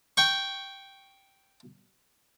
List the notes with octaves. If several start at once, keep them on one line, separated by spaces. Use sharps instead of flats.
G5 C#6